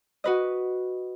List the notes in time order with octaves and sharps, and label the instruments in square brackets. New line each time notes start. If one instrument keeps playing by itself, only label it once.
[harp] F#4 B4 D#5